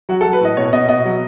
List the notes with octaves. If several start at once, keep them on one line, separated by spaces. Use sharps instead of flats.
F#3 F#4
A4
F#3
B4
A2 D#5
B2 C#5
B2 D#5
B2 D#5
F#3